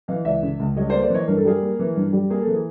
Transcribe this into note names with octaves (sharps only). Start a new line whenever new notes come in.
E3 D#5 F5
C#2 D5 E5
C#3
C#2
G3 C#5 D#5
C5 D5
A#3
C5 D5
E3 C#5 D#5
G2 A#4
A4
G3 G#4 A#4
A#3
E3
G2
G3
A#3 G#4
A4
E3
G#4